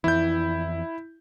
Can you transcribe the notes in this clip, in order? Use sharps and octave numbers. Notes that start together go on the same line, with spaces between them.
F2 E3 E4 G6